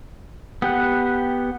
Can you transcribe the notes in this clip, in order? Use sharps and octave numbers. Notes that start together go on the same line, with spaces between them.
B3 G4 F#5